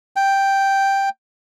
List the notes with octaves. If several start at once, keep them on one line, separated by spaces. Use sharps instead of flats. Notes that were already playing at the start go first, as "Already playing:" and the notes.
G5